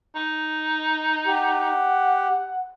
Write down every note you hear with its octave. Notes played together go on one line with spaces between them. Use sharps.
D#4
G4 F#5